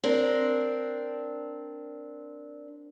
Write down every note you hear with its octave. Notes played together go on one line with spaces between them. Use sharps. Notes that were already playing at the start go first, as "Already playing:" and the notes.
C4 D4 A#4